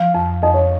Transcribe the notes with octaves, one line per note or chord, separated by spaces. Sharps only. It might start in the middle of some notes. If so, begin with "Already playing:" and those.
Already playing: F3 F5
F2
F2 D#5
C#5